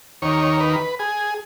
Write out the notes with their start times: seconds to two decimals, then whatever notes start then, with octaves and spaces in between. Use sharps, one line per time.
0.22 D#2 D#3 C#5
0.60 B4
0.99 G#4